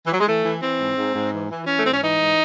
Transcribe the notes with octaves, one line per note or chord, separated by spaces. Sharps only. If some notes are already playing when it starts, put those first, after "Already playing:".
E3
F#3
G#3
E3 A3
E3
E3 C4
G#2
G#2
G#2
E3
E3
E3 C#4
A3
G#2 C4
C#4
E3 D#4
G#2